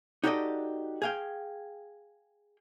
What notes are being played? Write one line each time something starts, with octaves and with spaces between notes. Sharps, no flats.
D#4 F#4 G4 A4 D5 D#5
G#4 F5 G5